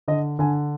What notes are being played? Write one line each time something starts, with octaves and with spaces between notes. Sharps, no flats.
D3 D#5
D3 G#5